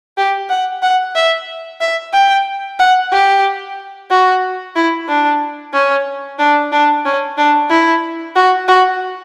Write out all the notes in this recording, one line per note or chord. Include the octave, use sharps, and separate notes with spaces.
G4
F#5
F#5
E5
E5
G5
F#5
G4
F#4
E4
D4
C#4
D4
D4
C#4
D4
E4
F#4
F#4